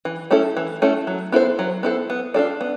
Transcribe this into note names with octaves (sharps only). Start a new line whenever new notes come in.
E3
A3 C#4 E4 A4
E3
A3 C#4 E4 A4
F#3
B3 E4 A4 C5
F#3
B3 E4 A4 C5
B3
D4 F4 A4 D5
B3